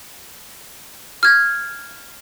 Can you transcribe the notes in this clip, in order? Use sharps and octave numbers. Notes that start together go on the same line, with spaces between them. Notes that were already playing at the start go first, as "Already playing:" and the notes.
F6 G#6